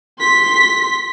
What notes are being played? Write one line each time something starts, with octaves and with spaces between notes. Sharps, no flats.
C6 B6